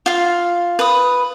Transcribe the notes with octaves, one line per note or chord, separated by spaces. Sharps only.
F4 F5
B4 D#6